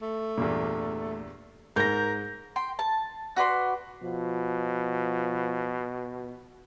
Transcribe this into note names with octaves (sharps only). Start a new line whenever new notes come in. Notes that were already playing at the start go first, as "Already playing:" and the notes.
A3
E2 G2 A#2
G#2 A#4 G6 A#6
G5 C6
A5
F#4 B4 D5 C6
B2 F3